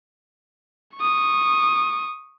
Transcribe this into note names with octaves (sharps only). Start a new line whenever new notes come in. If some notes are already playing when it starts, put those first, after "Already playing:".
C#6 D#6